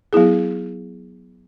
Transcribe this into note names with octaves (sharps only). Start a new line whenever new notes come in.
F#3 B3 E4 G#4